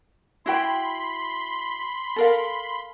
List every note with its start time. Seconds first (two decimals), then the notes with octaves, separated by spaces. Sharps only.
0.46 E4 F#4 G5 B5 C6
2.16 A4 A#4 F5